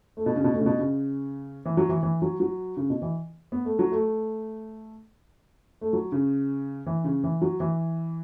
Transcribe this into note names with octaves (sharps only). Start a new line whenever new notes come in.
A3
B2
C#3
B2
A2
C#3
B2
C#3
E3
F#3
E3
E3
F#3
F#3
C#3
B2
E3
B3
A3
F#3
A3
A3
F#3
C#3
E3
C#3
E3
F#3
E3